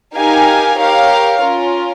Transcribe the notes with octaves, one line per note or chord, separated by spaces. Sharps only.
D#4 G4 A#4 F5 G#5
G4 A#4 C#5 F5
C#4 F4 A#4